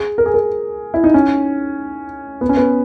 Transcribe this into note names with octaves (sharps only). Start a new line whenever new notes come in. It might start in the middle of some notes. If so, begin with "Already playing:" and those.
Already playing: G#4
A#4
G#4
A#4
E4
D#4
C#4
B3
C#4
B3